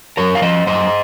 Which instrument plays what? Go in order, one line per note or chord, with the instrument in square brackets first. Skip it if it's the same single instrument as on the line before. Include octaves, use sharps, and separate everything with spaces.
[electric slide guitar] F#2 A#4 C#5
F5
F3 C5 D#5
F#2 C5 D#5